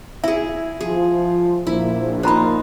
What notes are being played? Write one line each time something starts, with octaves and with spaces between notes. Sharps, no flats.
E4 G#4 E5
F3 F4 G#4
A#1 A#3 E4 C5
F3 A#3 D#4 F4 C5 A#5 B5